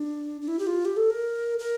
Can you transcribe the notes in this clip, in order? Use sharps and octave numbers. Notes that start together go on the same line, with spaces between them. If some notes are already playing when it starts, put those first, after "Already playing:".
Already playing: D4
D4
E4
G4
F4
G4
A4
A#4
A#4